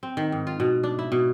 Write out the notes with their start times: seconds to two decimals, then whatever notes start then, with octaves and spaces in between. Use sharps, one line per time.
0.03 C4
0.17 D#3
0.32 G#2
0.47 F4
0.60 B2
0.83 D4
0.99 E4
1.12 B2